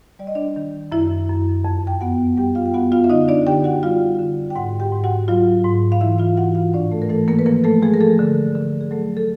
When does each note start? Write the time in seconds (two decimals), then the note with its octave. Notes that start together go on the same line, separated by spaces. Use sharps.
0.19 G3 D5
0.27 D#5
0.35 D4 D5
0.56 D#3
0.92 F#2 E4 E5
1.29 F#2
1.65 F2
1.87 G5
2.01 B3 F#4 F#5
2.37 G3 G4 G5
2.55 F4 F5
2.66 G5
2.74 B3 F#4 F#5
2.92 F4 F5
3.04 E5
3.10 D3 D#4 D#5
3.28 D4 D5
3.47 D3 G4 G5
3.64 F#4 F#5
3.83 G3 F4 F5
4.19 D3
4.50 G5
4.55 G#2 F#4 F#5
4.80 G4 G5
4.92 G#2
5.04 F#4 F#5
5.28 F#3 F4 F5
5.64 G#2
5.92 F5
6.01 E3 E4 E5
6.18 F4 F5
6.37 E3 F#4 F#5
6.55 F4 F5
6.73 A2 D4 D5
6.91 A3 A4
7.02 A#4
7.09 E3 A3 A4
7.28 A#3 A#4
7.39 B4
7.46 F3 A#3 A#4
7.64 A3 A4
7.82 F3 G#3 G#4
7.94 A#4
8.01 A3 A4
8.19 D3
8.55 D3
8.81 G#4
8.91 F#3 A3 A4
9.17 A4